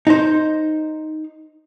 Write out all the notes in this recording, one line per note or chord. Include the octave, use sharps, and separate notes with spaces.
D#4 C5